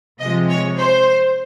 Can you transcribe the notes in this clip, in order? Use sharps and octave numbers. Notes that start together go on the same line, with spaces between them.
C3 F3 G#3 D#5
C#5
C5